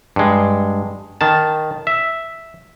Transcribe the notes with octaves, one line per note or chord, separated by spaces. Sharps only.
G2 G#3
D#3 A5
E5